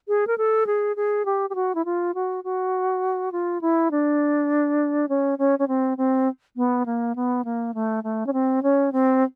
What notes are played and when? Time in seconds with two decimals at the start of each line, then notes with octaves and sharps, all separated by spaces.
0.08 G#4
0.27 A#4
0.38 A4
0.67 G#4
0.96 G#4
1.25 G4
1.50 G4
1.55 F#4
1.75 E4
1.85 F4
2.14 F#4
2.44 F#4
3.32 F4
3.61 E4
3.91 D4
5.09 C#4
5.38 C#4
5.59 C#4
5.68 C4
5.97 C4
6.56 B3
6.86 A#3
7.15 B3
7.45 A#3
7.74 A3
8.04 A3
8.26 C#4
8.33 C4
8.63 C#4
8.92 C4